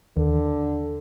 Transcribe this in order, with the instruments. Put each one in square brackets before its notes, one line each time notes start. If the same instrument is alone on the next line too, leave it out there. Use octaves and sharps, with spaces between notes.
[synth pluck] D#2 [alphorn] D3